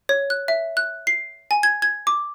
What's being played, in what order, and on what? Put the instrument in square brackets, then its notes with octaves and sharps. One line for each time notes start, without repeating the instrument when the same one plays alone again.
[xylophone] C#5
F#6
E5
F#6
C7
G#5
G#6
G#6
D6